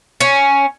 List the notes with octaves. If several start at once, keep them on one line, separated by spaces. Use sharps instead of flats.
C#4